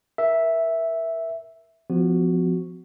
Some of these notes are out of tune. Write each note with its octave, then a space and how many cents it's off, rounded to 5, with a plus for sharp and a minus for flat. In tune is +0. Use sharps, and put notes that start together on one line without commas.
A#4 +15 E5 +0
F3 +0 B3 +45 F#4 +0